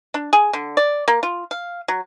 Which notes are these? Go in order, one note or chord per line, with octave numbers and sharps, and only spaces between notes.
D4
G#4
D3
D5
A#3
F4
F5
F#3